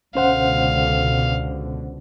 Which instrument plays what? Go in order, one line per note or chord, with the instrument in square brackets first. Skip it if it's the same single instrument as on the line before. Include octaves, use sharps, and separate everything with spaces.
[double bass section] C#2 B2 D3 [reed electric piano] C#4 C5 F#5 [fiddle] F5